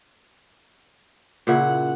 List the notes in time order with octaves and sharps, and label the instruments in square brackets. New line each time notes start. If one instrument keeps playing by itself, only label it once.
[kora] A#2 C#3 E4 [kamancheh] F#5